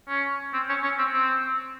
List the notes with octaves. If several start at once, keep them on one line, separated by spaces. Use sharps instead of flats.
C#4
C4
C#4
C#4
C4
C4